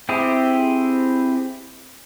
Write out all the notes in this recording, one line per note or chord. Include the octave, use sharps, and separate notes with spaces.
C4 E4 G4 G#4